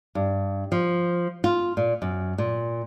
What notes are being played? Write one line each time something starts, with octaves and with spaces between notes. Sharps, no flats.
G2
F3
F4
A#2
F#2
A#2